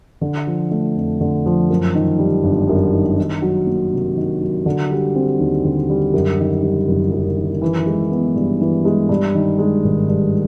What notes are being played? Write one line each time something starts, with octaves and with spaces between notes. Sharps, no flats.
D3
F3
A3
F2
D3
F3
F#2
D#3
G3
G1
F#2
D#3
D#3
F#3
A#3
C3
D#3
F#3
D3
G3
C4
D#2
D3
G3
F#2
D#3
G3
F#1
F#2
D#3
E3
G#3
B3
G2
E3
G#3
G2
D#3
G#3
G#1
G2